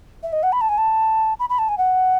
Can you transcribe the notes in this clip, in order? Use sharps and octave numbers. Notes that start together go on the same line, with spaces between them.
E5
D#5
F#5
B5
A5
G#5
A5
B5
B5
A5
G#5
F#5